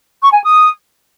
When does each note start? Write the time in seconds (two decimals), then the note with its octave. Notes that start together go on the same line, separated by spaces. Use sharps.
0.22 C#6
0.33 G#5
0.44 D#6